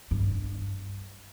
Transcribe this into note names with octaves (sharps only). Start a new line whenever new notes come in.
G2